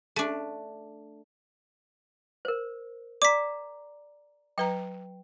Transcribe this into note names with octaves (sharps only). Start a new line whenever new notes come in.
A3 D4
A#4 C5
D5 A#5 D6 B6
F#3 B4 G5 A#5